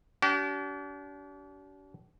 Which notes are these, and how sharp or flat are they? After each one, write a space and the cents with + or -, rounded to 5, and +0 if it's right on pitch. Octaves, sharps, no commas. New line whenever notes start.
D4 -40 G4 -45